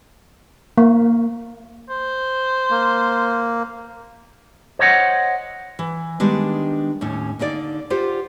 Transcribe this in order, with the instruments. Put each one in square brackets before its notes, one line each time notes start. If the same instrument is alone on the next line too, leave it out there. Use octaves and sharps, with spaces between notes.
[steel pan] A#3
[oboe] C5
[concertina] A#3
[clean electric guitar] C5 C#5 D#5 F#5
[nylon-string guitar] E3
D#3 G3 G#3 B3 D4
D#2 A2 C#4
D3 A#3 D#4 D5
F4 G4 C5 F#5